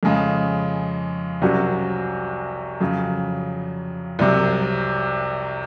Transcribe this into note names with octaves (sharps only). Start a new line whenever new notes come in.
F2 C#3 G#3
C2 C3 F#3 C#4 F#4
F2 C#3 F#3
C2 C3 F#3